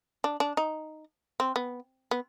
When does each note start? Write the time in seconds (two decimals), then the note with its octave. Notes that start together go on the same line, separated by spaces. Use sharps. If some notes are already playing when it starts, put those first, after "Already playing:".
0.24 D4
0.40 D4
0.57 D#4
1.40 C4
1.56 B3
2.11 B3